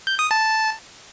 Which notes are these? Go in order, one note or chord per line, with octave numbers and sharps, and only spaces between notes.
G6
D#6
A5